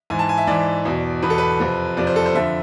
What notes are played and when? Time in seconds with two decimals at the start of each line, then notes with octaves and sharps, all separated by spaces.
0.10 G#2 E3 G#5
0.19 A5
0.29 G#5
0.37 E5
0.47 G#2 E3 D5
0.85 E2 B2
1.22 E2 B2 B4
1.30 A4
1.38 B4
1.60 F2 C3 F3
1.97 F2 C3 F3 D5
2.07 C5
2.16 A4
2.26 C5
2.35 F2 D3 F3 E5